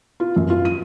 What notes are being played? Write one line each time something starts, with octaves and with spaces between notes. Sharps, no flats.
F4
F#2
F4
D#7